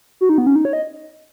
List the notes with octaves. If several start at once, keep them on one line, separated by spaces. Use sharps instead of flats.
F#4
D#4
B3
C#4
D#4
C#5
D#5